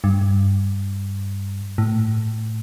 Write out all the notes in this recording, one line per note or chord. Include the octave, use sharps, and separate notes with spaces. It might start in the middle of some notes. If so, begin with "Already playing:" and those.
G2
A2